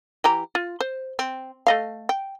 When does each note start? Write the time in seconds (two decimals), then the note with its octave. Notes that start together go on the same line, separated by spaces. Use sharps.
0.24 E3 G4 A#5
0.55 F4
0.80 C5
1.19 C4
1.67 A3 D#5 F5
2.09 G5